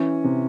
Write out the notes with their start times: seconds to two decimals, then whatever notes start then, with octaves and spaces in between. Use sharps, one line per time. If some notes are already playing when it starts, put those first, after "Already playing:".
Already playing: E3 C#4
0.24 C3